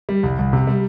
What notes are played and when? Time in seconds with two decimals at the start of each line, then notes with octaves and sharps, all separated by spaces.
0.09 G3
0.23 C2
0.39 C2
0.53 C3
0.67 G3